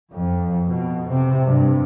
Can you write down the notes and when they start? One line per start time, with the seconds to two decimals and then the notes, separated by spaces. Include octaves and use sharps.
0.13 F2
0.68 B2
1.07 C3
1.45 G2